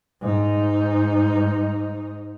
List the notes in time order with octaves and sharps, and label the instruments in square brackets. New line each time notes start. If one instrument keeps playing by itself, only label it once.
[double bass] G#2 D#4